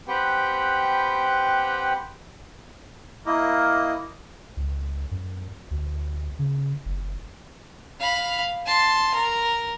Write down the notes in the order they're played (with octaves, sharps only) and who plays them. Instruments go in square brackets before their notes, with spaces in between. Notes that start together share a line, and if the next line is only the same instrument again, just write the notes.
[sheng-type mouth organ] C4 G4 B4 F#5 G5
[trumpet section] A#3 [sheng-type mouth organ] E4 D#5
[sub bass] C#2
F#2
D2
C#3
F#1
[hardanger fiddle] F5 B5
A5 C6
A#4